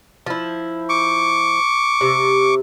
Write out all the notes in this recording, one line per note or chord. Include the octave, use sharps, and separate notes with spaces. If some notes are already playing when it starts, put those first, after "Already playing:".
F3 E4
C#6 D6
C3